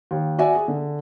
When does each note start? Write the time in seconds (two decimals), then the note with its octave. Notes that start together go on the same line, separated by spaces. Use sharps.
0.11 D#2
0.38 F#4 D5 E5 G#5
0.55 G#4
0.68 D3